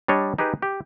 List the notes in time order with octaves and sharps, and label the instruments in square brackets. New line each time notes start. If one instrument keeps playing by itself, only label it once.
[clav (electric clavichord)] G3 D4 C#5 D#5
D#4 G4 G#4 B4
G4